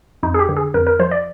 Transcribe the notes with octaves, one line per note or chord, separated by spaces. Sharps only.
F2 D#4
G#4
G4
D3
G#4
F2 A#4
A#4
F3 C5
D5